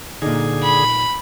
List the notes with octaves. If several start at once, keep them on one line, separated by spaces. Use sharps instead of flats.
A#2 D3 D#4 G#4
B5